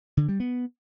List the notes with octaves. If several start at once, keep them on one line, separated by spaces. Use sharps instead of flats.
D3
G3
B3